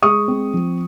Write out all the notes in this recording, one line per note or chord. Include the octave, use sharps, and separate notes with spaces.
G#3 C#6 D#6
C4
F3